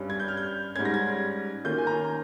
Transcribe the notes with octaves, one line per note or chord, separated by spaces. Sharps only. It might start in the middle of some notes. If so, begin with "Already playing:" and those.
Already playing: G2 G3 C#4
G#6
G6
F6
G6
G#2 G3 C#4 G#6
A#6
G#6
D#3 A#3 C#4 F4 G6
G#5
A#5